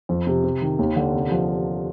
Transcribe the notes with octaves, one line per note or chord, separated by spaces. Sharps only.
F2
C3
C3
D#3
D#2
D3
C3
F3